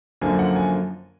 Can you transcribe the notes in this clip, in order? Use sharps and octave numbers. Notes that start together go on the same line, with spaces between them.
F#2 D3 F3 A#3 G#5
F#5
G#5